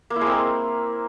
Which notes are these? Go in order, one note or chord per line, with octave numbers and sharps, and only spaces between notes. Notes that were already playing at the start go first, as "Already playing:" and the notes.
A#3
E4
G#3
C4
A#4